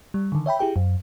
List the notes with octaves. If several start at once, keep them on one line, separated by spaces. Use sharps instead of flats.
G3
D3 D#3
C#5 E5 G5 B5
E4 G4 G#4 G5
F#2